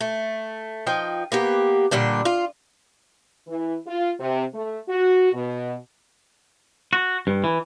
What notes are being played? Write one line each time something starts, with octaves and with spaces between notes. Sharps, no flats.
A3
F3 D#4 G5
A#3 B3 G4
A#2 D3 G3 D4
F4
E3
F4
C3
A3
F#4
B2
F#4
G2
E3